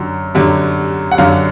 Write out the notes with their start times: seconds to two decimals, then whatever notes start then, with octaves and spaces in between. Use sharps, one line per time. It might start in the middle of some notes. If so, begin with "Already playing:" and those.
Already playing: F#2 D3 F#3
0.35 F#2 D3 F#3
1.11 F#5
1.18 F#2 D3 F#3 F5